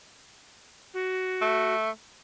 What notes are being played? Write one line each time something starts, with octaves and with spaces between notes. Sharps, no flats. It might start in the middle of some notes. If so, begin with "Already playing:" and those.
F#4
A3